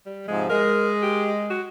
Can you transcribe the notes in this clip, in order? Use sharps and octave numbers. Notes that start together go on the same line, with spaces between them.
G3
G#2 C3 F3 G#3
G#3 A#4
G4
F#4